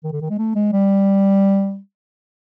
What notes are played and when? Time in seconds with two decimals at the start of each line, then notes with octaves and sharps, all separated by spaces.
0.04 D#3
0.12 D3
0.21 D#3
0.30 G#3
0.38 A3
0.55 G#3
0.73 G3